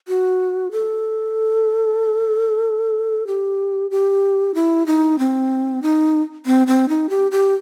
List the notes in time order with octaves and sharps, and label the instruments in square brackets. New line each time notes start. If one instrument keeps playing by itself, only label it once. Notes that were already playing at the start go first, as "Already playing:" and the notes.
[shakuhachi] F#4
A4
G4
G4
E4
D#4
C4
D#4
C4
C4
D#4
G4
G4